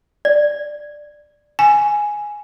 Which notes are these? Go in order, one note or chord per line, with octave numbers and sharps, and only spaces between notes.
D5
G#5